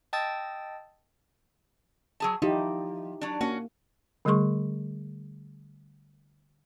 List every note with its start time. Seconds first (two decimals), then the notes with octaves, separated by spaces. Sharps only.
0.13 D#5 G5 A5 D#6 E6 A6
2.20 F#3 G#4 A5
2.42 F3 D#4 E4 G4
3.21 F#3 D4
3.41 A#3 C#4 F#4
4.25 D3 G3 A3 G#4 C6 C#6